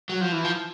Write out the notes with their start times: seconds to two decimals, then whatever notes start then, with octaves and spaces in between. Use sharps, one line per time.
0.09 F#3
0.21 F3
0.32 E3
0.44 F3